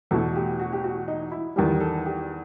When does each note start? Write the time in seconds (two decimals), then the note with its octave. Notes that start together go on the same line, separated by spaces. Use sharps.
0.11 E2 B2 A3 A4
0.36 G4
0.60 F#4
0.73 G4
0.84 F#4
1.08 D#4
1.32 E4
1.56 E2 D#3 G3 G4
1.80 A4
2.06 G4